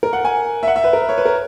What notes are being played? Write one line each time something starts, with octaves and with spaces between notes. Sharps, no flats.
A#4
F#5
G#5
E5
F#5
E5
B4
A#4
B4
C#5
B4
A#4